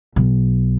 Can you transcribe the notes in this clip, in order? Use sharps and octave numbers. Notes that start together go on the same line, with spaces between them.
B1